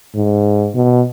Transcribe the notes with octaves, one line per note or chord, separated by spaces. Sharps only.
G#2
B2